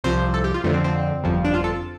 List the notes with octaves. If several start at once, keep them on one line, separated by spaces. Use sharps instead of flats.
C2 C3 F3 C5
A4
G4
F4
F2 D3 F3 A3
C4
C4
G1 F2 F3
D4
F4
A4